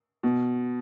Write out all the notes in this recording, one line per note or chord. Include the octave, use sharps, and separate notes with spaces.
B2